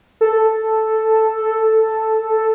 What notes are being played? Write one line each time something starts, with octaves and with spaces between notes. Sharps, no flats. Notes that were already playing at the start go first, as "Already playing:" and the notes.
A4